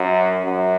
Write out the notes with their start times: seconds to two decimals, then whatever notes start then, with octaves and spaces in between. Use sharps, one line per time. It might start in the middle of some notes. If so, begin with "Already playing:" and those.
Already playing: F#2
0.44 F#2